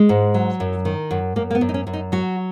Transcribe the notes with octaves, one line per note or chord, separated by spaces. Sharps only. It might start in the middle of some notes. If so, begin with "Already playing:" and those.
Already playing: G#3
G#2
F#3
F#2
D#3
F#2
F#2 A#3
A#3
B3
F#2
D#4
C#4
F#2
D#4
F#3 F#4